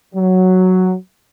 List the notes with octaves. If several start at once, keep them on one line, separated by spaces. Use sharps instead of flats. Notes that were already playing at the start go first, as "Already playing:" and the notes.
F#3